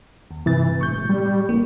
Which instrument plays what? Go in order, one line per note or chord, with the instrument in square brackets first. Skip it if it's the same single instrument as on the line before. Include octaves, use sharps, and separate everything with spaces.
[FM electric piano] D#2
[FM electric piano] G2 C3 A6 [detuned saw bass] E3
[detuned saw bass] E1 [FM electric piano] A2 C#6 G6
[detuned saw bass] G3
[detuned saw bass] A1 [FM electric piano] A#3